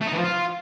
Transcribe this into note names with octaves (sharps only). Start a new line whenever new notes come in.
A3
D#4
E3
F3
F4